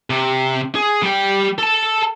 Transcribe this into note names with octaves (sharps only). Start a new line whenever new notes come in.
C3
G#4
G3 G5
A4 A5